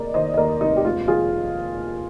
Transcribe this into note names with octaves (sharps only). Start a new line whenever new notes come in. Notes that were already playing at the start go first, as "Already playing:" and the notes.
Already playing: F1 D#2 A#3 G#4 A#4 D5 D#5
D#3 C5 D#5
D#5
D#2 A#4 D5
F1 D#4
G4
G#3 F4
F3 F4 G#4